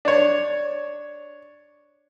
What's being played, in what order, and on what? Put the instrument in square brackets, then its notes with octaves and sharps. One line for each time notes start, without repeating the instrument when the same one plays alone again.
[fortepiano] D4 C#5